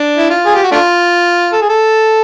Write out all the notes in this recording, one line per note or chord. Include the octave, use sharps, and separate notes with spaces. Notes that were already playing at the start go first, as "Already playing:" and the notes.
Already playing: D4
E4
F4
G#4
G4
F#4
A3 D4 F4
A4
G#4
A4